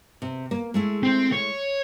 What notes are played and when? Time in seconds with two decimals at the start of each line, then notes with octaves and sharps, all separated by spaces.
0.22 C3
0.51 A#3
0.74 G#3 A3 E4
1.03 C4
1.33 C#5